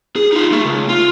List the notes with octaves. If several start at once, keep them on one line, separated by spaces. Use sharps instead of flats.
G#4
D#4 F4
A3 A#3
C#2
F4